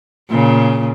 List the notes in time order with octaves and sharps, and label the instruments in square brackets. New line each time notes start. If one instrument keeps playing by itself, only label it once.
[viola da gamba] A#2 C#3